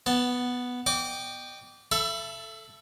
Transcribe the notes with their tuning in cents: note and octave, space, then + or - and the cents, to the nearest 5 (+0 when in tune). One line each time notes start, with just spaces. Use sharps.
B3 +0 A5 +0
D#5 -40 G5 +0 D6 -25
A4 +0 E5 +30 B5 +0